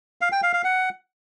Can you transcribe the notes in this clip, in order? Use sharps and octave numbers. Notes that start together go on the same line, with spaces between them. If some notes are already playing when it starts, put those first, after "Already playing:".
F5
G5
F5
F5
F#5